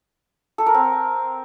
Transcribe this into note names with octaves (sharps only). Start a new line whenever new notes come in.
A4
A#4
C4